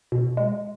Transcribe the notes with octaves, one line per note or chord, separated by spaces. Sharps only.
B2
G#3